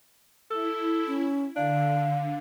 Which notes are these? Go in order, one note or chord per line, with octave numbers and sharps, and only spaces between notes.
E4 A4
C#4
D3 D4 F5